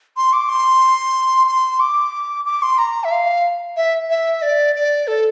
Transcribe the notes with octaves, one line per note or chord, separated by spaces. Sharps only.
C6
D6
C6
C6
D6
D6
C6
A#5
E5
F5
E5
E5
D5
D5
A4